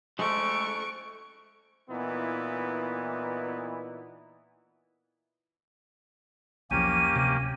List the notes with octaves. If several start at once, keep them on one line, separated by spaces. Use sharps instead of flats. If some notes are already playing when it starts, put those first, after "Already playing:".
G#3 A3 A4 C5 C#6 D7
A#2 E3 B3 D#4 E4
B1 E2 F3 A#3 C#4 G4 D#7
D1 C3